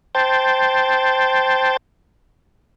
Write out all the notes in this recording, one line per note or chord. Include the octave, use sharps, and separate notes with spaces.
C5 G5 A5